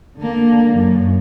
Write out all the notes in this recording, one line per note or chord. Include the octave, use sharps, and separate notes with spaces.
D3 A#3
F#2